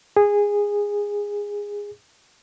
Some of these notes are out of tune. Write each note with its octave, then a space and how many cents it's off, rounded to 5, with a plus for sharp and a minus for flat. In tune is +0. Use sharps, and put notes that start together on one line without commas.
G#4 -15